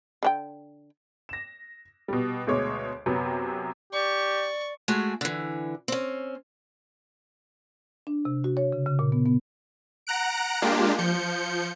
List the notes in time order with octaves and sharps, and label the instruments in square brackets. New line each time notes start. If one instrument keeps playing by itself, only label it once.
[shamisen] D3 D4 G5
[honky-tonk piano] A#6 E7
B2 G3
D2 B2 G#3 C#5 D6
F#2 C3 F#3 B3
[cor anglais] G4 [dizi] D5 [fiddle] C#6
[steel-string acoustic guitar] G#3 A3 F#4 G#4
D3 E3
C4 C#4
[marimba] D4
C3
F#4
C#5
C#3
C#3
A#2
B3
B3
[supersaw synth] F#5 A#5 F#6 D7
G#3 A#3 D4 F4 G4
F3 G6 C#7